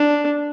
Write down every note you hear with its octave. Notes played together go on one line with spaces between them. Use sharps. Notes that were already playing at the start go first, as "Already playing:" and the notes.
Already playing: D4